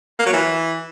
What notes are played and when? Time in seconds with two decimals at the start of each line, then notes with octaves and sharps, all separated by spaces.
0.19 A#3
0.26 F#3
0.33 E3